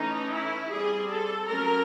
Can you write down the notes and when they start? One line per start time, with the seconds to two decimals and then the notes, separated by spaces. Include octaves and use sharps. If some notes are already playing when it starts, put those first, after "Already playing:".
Already playing: E3 A3 C#4 D#4
0.32 E4
0.70 G3 C4 G#4
1.08 A4
1.47 F#3 A3 C#4 A#4